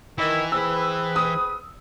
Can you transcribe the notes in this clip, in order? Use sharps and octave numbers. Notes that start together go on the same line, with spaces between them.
D#3 E3 E4
C4 G#4 B4 E6
D#6